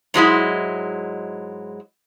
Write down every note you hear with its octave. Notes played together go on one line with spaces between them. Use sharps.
G#2 F#3 G#3 E4